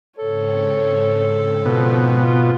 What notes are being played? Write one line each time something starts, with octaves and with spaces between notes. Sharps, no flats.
G#2 C#3 C4 A4 C#5
B2 F3
F4